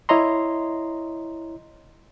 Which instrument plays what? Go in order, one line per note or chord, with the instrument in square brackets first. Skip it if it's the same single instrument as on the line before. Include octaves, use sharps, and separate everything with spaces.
[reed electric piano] E4 C#5 D#5 A#5 C6